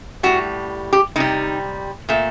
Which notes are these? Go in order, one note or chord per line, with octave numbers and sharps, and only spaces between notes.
A2 G3 F#4
G4
C3 G3 D#4
A#2 A3